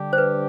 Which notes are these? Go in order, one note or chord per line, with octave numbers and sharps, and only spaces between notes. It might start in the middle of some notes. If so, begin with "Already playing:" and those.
Already playing: D3 G3 D4 G4
C5
B4